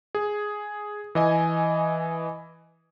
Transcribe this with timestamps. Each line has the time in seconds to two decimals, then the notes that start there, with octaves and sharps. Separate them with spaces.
0.15 G#4
1.15 E3 D#5 G#5